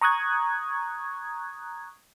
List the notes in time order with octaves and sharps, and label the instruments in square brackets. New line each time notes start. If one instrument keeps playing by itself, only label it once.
[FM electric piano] A#5 C#6 D#6 F#6 G#6